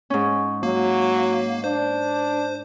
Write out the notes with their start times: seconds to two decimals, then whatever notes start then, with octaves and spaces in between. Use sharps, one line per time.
0.10 G#2 C#4
0.63 F#3 A#3
1.64 D4 C5